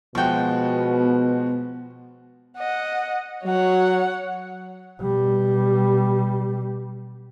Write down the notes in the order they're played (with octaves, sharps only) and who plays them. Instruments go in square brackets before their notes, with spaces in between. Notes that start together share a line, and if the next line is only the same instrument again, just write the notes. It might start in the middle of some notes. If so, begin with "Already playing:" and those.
[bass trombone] B2 [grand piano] F3 G#3 F#4 [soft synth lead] B3 [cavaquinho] G5 C#6
[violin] D#5 F#5
[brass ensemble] F#3 [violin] C#5 F#5
[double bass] B2 G3